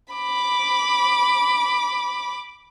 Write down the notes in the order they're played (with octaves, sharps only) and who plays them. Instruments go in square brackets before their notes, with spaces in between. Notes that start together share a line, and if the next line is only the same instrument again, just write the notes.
[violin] B5 D6